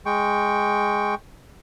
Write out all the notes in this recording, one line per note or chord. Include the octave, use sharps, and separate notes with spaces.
G#3 G5 C#6